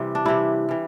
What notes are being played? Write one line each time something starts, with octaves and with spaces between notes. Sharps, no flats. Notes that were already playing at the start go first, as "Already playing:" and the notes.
Already playing: C3 E3 G3
D4
C3 E3 G3 E4
E3 G3